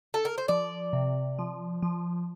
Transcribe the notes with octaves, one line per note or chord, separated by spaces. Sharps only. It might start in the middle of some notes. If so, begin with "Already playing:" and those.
A4
A#4
C5
F3 D5
C3
F3
F3